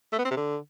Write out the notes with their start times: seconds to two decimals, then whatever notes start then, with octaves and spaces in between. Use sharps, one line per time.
0.13 A3
0.19 B3
0.25 C4
0.31 C3
0.37 D3